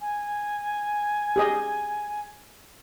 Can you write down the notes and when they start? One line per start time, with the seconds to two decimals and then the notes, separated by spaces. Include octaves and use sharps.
0.01 G#5
1.36 G4 G#4 D#5